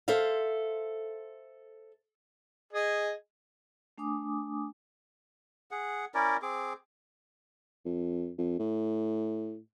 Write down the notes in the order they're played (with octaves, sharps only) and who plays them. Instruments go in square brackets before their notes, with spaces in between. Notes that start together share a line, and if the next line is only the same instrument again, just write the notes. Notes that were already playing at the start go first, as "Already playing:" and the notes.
[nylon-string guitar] A4 C5 E5 F5
[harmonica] G#4 D#5
[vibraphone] A3 D4 G#5 D6 D#6
[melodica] G#4 F#5
C#4 E4 A#4 D5
C4 G#4 D6
[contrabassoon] F2
F2
A2